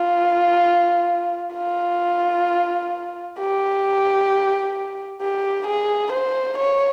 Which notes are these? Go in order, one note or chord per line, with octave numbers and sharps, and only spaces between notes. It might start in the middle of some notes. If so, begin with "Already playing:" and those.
Already playing: F4
F4
G4
G4
G#4
C5
C#5